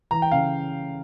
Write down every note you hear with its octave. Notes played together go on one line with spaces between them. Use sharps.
E3 A#5
G5
C#3 F5